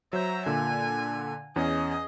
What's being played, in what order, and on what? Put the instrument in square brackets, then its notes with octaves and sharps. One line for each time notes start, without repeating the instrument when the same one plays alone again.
[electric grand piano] F#3 C5 G6 [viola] E5 A#5
[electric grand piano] A#2 D3 [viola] G#5
[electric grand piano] E2 C#4 [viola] G#4 D#5